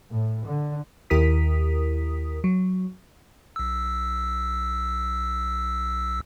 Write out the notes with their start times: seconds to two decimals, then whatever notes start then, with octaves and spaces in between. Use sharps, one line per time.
0.10 A2
0.47 D3
1.10 D#2 E4 G4 A#4 D#6 B6
2.44 F#3
3.56 B1 E6